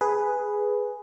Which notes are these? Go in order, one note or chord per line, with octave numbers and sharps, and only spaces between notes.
G#4 B4